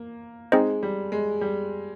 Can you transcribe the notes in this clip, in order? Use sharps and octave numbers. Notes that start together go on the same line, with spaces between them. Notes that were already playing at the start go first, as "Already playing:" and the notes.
Already playing: A#3
G#3 C4 D#4 G#4 C5 D#5
G3
G#3
G3